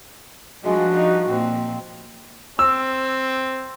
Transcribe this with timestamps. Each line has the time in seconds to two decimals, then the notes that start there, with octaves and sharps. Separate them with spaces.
0.64 F3 G3 G#3 D4 F#4
0.96 D#4
1.30 A#2 F3 C4
2.59 C4 E6